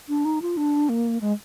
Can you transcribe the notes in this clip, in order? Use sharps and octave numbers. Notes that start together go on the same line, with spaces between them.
D4
D#4
F4
D4
A#3
G#3